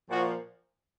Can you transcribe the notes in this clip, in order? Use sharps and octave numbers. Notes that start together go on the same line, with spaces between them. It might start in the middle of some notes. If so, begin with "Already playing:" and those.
A#2 F3 F#4